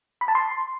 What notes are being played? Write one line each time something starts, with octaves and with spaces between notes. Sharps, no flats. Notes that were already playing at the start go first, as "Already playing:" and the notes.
B5
A5
C6